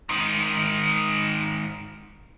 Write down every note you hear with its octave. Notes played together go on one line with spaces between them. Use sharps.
G#2 D#3